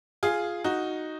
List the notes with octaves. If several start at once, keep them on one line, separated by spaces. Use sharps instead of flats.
F4 G#4
D#4 F#4